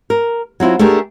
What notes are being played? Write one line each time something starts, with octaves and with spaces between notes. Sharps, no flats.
A#4
F#3 C4 E4 F4
A3 D4 G4 G#4 A#4